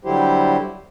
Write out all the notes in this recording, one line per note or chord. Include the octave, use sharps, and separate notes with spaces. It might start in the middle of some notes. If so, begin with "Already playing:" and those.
D3 F#3 G3 E4 G4 C5